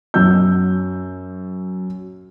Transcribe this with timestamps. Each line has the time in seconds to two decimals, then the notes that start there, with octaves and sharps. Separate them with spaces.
0.14 F#2 E6 G6